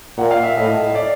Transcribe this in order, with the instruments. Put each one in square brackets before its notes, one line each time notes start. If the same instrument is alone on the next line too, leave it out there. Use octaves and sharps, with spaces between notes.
[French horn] A#2 [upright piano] F#5
[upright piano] F5
E5
[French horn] A2 [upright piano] D#5
[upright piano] D5